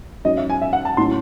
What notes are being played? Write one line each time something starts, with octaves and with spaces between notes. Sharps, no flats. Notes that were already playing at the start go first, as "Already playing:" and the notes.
G#2 F#3 C#4 D#5
E5
G#5
E5
F#5
A5
A2 F#3 C#4 C6